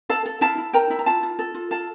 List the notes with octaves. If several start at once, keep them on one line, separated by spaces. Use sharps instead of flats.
A4 F5 A5
A4
E4 F5 A5
E4
A#4 G5 A#5
E4
A#5
F4 F5 A5
F4
A4
F4
A4 F5 A5